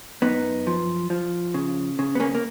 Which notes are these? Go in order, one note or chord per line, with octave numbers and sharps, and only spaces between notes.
F#2 B3 D#4
F3
F3
C#3
C#3
B3
A#3 C#4
A#3